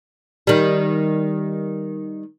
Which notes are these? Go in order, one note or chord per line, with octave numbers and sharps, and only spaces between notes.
D#3 G3